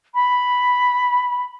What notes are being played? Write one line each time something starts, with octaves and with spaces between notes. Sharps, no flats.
B5